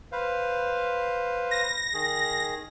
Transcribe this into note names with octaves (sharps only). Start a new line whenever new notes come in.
B4 C5 F5
A#6
D#3 G#4